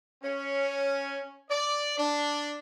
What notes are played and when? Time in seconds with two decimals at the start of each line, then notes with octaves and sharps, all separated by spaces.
0.23 C#4
1.50 D5
1.98 D4